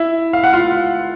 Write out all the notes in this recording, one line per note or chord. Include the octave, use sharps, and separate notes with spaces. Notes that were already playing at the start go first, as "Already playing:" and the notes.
Already playing: E4 E5
F5
F#5
F4 F5